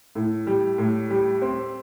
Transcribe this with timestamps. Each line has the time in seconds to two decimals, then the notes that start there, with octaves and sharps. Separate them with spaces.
0.15 A2
0.47 G3
0.78 A2
1.10 G3
1.42 C4